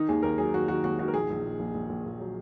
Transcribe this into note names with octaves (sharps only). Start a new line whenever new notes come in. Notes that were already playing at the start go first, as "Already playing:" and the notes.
Already playing: D#3 D#4
D#2 G#4
D#2 A#4
F#3 G#4
D#2 F#4
D#3 F#4
D#2 F#4
D#3 F#4
A#4
A#1 G#4
A#1
A#2
A#1
A#1
A#1
A#1
F#3